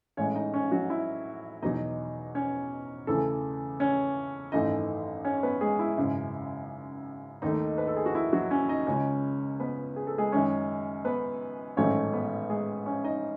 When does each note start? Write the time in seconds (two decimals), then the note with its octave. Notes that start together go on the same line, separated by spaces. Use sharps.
0.17 A1 A2 G#3 C#4 C#5
0.35 D#4 D#5
0.54 C#4 C#5
0.72 F#3 F#4
0.90 E4
1.62 E2 B2 F#3 D#4 D#5
2.35 C#4 C#5
3.07 E2 C#3 E3 A3 A4
3.80 C#4 C#5
4.52 G#1 F#2 E3 A3 D#4 D#5
5.25 C#4 C#5
5.43 B3 B4
5.61 G#3 G#4
5.79 E4
5.97 G#1 F#2 C#3 G#3
7.42 D#2 D#3 A3 D#4
7.78 B4
7.87 A4
7.96 G#4
8.06 F#4
8.15 E4
8.33 F#3 F#4
8.51 C#4 C#5
8.69 D#4 D#5
8.87 C#2 C#3 G#3 C#4 C#5
9.60 B3 B4
9.96 G#4
10.07 A4
10.18 G#3 G#4
10.32 F#2 D#3 G#3 C#4 C#5
11.05 B3 B4
11.77 A1 G#2 D#3 F#3 A3 C#4 C#5
12.13 B3 B4
12.50 G#3 G#4
12.86 C#4 C#5
13.04 D#4 D#5